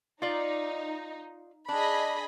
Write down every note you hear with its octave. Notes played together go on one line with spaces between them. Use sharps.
D#4 F4 D5
D4 G#4 D#5 B5